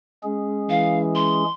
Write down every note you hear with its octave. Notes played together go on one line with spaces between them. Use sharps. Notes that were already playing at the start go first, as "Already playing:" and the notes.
G#3 C#4 G#4
E3 F5
C6